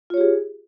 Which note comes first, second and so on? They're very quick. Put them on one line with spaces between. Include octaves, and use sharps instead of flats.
F4 C#5 G4 G#4